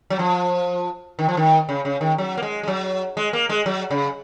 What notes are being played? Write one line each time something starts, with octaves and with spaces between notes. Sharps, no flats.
F#3
F3
D#3
F3
D#3
C#3
C#3
D#3
F#3
A#3
G#3
G#3
F#3
G#3
A#3
G#3
F#3
C#3